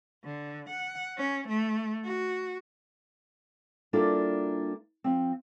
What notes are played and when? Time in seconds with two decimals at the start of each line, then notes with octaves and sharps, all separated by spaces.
0.24 D3
0.70 F#5
1.17 C#4
1.48 A3
2.05 F#4
3.93 G3 A#3 D4 E4 F4 A4
5.04 F3 C4